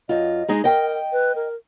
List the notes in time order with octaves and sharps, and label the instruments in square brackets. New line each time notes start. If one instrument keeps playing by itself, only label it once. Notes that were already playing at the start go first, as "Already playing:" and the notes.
[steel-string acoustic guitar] F#2 F4 [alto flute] D#5
[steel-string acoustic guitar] G#3 D#4 G#4
[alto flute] A#4 [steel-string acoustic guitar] D#5 G5
[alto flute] B4
A#4